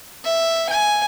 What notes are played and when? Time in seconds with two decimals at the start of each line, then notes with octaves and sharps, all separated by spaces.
0.24 E5
0.69 G#5